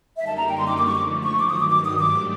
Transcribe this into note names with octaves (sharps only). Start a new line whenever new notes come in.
F#2 D3 G3 A#3 D#4 E5
A5
A#5
G5
C6
D6
D3 F3 A3 D6
C#6
D6
C#6
G2 D#3 F#3 D6
D#6
D6
D6
D#6
G#2 F3 A3 D4 G4 D6